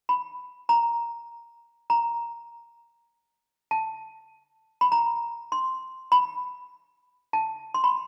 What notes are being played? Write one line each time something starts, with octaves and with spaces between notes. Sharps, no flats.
B5
A#5
A#5
A5
B5
A#5
C6
B5
A5
C6
B5